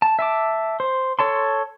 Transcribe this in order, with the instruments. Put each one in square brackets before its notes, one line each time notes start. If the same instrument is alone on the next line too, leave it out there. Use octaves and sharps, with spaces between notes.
[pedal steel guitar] A5
E5 A5 D6
C5
A4 C#5 A5 C6